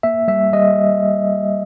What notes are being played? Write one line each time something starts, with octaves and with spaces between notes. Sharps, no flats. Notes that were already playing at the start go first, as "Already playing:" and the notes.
A#3 E5
G3 E5
G3 D#5